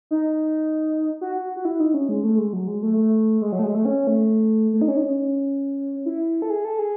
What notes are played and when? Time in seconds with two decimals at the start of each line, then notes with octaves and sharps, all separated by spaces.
0.11 D#4
1.21 F#4
1.35 F#4
1.56 F#4
1.65 E4
1.80 D#4
1.94 C#4
2.09 G#3
2.24 A3
2.38 G#3
2.53 F#3
2.68 G#3
2.83 A3
2.97 A3
3.42 G#3
3.52 F#3
3.59 A3
3.63 G#3
3.74 A3
3.85 C#4
4.07 A3
4.74 A3
4.81 D#4
4.88 C#4
4.97 D#4
5.03 C#4
6.06 E4
6.42 A4
6.50 G#4
6.65 A4
6.79 G#4